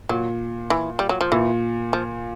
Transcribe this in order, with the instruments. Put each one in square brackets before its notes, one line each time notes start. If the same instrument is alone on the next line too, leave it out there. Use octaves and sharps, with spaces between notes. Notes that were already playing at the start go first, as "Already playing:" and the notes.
[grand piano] A#2 [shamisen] F#3
[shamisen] E3
G3
F#3
F3
[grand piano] A#2 [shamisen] E3
[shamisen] F3